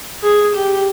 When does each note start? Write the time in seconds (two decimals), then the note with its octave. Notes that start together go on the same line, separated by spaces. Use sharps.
0.23 G#4
0.54 G4